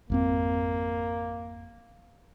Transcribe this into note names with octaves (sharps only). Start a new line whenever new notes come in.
G#1 F2 A#3 C4